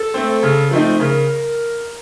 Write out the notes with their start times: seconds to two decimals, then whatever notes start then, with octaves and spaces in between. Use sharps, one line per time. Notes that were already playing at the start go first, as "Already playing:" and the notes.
Already playing: A4
0.14 A3 C4
0.43 C#3
0.71 F3 A3 C4 D#4
1.00 C#3 A#4